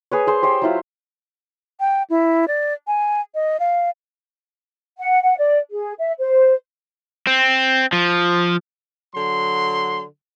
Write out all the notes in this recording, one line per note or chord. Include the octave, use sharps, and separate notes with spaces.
G#4 B4 C#5
G#4 C5
G4 C5 C#5 G5
F#3 E4 F4
G5
E4
D5
G#5
D#5
F5
F#5
F#5
D5
G#4
E5
C5
C4
F3
D3 F#3 C6